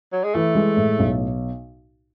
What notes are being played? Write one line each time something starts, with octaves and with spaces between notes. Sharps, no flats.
F#3
G#3
E3 A3
G#3
A2
B1